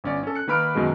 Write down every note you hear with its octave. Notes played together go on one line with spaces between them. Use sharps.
G1 C#4 D5
C#4 A4
F#6 C#7
D#3 A#3 B4 B5 F6 D7
F#2 B2 D#3 G#3